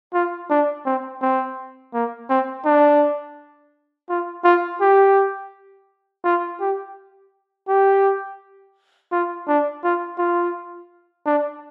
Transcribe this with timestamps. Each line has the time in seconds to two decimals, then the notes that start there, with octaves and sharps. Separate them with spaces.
0.14 F4
0.50 D4
0.85 C4
1.22 C4
1.94 A#3
2.30 C4
2.65 D4
4.09 F4
4.44 F4
4.81 G4
6.24 F4
6.61 G4
7.68 G4
9.12 F4
9.47 D4
9.83 F4
10.18 F4
11.26 D4